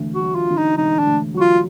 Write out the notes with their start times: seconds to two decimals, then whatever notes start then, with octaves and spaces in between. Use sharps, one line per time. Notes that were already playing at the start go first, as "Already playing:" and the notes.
Already playing: E1 D2 D3
0.15 F#4
0.21 F#3
0.35 F4
0.50 D3
0.57 D#4
0.77 E1 D#4
0.99 D4
1.06 D2
1.34 F#3 F#4
1.40 F4